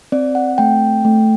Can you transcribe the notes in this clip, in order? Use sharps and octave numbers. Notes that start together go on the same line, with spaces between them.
C4 D5
F#5
A3 G5
A3